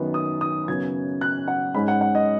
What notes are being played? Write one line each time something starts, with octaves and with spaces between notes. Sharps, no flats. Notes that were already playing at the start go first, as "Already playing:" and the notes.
Already playing: F#2 D#3 B3 D#4
D#6
D#6
F#2 C#3 B3 G#6
F#6
F#5
G#2 G#3 C#4 B5
F#5
F#5
D#5